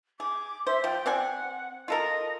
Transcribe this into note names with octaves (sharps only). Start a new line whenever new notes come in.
G#4 D6
C5 E5
F3 G5
C4 D5 F#5 G#5
F4 A4 A#4 D#5